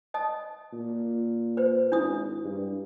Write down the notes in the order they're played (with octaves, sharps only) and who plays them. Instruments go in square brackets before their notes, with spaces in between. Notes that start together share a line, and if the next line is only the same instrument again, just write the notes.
[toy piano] D#5 A5 D#6
[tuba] A#2
[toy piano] B4 C5
[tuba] G#1 [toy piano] D4 E4 D#6
[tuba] G2